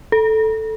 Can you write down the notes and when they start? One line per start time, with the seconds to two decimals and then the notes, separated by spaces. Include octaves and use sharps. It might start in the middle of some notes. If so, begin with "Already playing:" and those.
0.12 A4